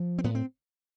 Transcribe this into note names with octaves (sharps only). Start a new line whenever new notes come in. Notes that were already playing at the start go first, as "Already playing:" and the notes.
Already playing: F3
C4
A2 B3
C4